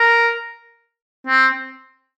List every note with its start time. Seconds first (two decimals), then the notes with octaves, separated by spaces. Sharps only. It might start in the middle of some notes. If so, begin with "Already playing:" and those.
Already playing: A#4
1.27 C4